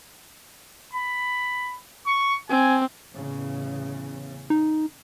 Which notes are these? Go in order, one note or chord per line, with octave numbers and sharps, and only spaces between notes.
B5
C#6
C4 G#5
A1 E2 C#3
D#4